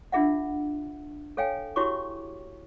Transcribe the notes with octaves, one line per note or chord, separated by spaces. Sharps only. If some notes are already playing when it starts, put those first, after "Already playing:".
D4 F4 G#4 E5 F#5
A4 C#5 F5 G5 G#5
E4 F#4 G4 C#5 C#6 D6